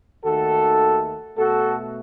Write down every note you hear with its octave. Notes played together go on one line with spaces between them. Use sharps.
D#2 D#3 A3 F#4 A4
B2 A3 F#4 A4